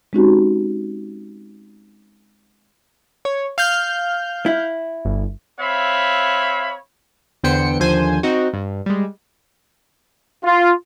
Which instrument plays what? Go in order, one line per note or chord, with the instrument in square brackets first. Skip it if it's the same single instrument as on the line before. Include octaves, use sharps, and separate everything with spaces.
[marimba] G#3 C4 C#4 D#4 F#4 G4
[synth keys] C#5
F5 F6 G6
[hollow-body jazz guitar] E4
[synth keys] G1
[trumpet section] C4 C#5 E5 F5 B5
[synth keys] E2 D3 B3 C5 G5 C#7
D#2 D3 F3 C5 G#5
C4 D#4 F#4
G2
G3 G#3
[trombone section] F4